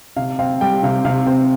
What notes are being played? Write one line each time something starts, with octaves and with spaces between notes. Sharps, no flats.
C3 F5
C4 F5
G3 G5
C3 F5
C3 F5
C4 C5